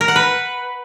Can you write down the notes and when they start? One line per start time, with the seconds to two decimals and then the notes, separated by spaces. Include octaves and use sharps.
0.01 A#4
0.08 F#5
0.16 B4